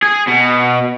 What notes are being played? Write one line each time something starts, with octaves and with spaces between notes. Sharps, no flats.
G#4
B2